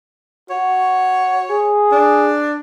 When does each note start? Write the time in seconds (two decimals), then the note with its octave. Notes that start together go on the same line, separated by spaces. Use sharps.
0.50 F#4 C#5
1.50 G#4
1.92 D4